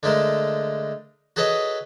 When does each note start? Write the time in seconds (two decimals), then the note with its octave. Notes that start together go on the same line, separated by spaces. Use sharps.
0.03 D3 G#3 A3 A#4
1.36 F#4 G#4 A4 B4 C#5 D#5